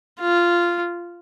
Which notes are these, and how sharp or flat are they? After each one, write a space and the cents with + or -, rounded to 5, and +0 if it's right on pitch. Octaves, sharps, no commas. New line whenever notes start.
F4 -10